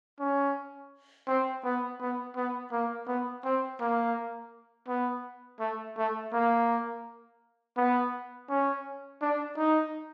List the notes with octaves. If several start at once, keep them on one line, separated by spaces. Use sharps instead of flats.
C#4
C4
B3
B3
B3
A#3
B3
C4
A#3
B3
A3
A3
A#3
B3
C#4
D4
D#4